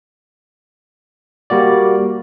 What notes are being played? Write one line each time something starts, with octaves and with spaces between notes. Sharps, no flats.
G3 A#3 F#4 D5